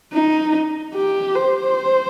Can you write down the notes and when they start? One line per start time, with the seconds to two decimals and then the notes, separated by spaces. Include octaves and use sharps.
0.13 D#4
0.95 G4
1.35 C5